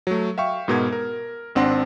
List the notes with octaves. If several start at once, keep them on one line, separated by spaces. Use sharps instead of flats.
F#3 A3
E5 F5 G5 C#6
G#2 B2 B3 A#4 G#6
A#4
G#1 C4 D4 F#5 C6 A#6